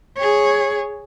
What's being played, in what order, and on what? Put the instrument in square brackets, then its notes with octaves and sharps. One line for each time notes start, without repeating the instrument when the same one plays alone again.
[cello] G#4 C#5